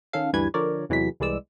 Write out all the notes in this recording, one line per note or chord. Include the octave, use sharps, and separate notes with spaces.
D#3 C#4 A4 F5
D2 G2 E3 G3 B4 G#6
D3 F3 A#4 C#5 D5
E2 C3 E3 F#3 G#3 B6
C2 E3 G#3 D5 E6